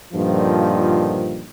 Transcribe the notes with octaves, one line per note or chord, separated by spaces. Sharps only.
G2 A#2 D3 D#3 F3